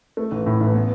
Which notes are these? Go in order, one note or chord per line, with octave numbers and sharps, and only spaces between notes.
A3
A1
A2
A1
B3